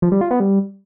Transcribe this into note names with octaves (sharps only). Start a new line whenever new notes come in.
F3
G3
F4
B3
G3